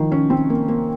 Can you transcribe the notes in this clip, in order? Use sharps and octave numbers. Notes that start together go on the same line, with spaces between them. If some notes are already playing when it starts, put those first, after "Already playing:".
Already playing: D#3 F3
C#4
C4
A#3
A#3